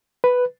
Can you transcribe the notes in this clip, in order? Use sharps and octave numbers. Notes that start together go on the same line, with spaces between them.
B4